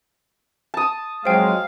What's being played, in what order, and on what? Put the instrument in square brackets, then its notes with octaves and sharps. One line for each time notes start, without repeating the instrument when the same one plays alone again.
[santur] A5 D#6
[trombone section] F2 F#3 G#3 [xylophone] C5 G5 [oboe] F5